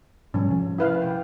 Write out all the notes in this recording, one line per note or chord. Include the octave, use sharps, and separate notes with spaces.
G#2 F3 G3 C#4
C3 F3
E4 B4 F5
G5